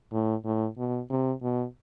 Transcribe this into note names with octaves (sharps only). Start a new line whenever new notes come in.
A2
A2
B2
C3
B2